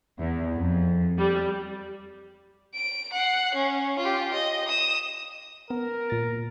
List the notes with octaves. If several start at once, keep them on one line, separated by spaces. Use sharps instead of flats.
E2
F2
G3
D7
F#5 C7
C#4
F4 G4
D#5
D#6 E7
B3 A#4
A#2 A6